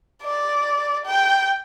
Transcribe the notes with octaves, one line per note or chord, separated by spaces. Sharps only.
D5
G5